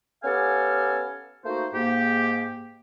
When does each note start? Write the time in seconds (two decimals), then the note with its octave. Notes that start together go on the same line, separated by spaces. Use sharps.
0.24 B3 C#4 G4 A4 F5 G#5
1.45 A3 A#3 D#4 F#4 C5
1.73 G#2 A#3 G4